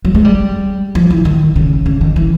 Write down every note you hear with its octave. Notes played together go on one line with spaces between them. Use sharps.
F#3
G#3
G3
F3
E3
D#3
C#3
C#3
D#3
E3